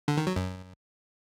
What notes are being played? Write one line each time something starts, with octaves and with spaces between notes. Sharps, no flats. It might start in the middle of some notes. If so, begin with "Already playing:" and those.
D3
D#3
F#3
F#2